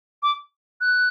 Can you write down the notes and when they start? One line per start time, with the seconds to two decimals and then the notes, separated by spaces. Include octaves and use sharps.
0.23 D6
0.81 F#6